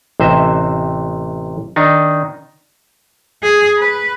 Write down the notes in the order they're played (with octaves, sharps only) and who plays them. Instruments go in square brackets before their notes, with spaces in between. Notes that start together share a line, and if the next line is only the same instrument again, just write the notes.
[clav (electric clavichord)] A1 C3 C5 D#5 E5
D#3 D4 D#4
[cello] G#4
B4